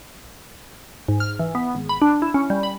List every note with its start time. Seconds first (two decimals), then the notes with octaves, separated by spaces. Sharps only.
1.08 G#2
1.20 F6
1.39 E3
1.55 B3
1.75 G#1
1.89 B5
2.02 D4
2.22 E4
2.34 C#4
2.50 G3
2.63 B5